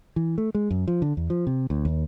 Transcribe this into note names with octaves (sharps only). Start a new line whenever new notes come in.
E3
A3
G#3
F#2
F3
D3
E2
F3
C3
D2
D#2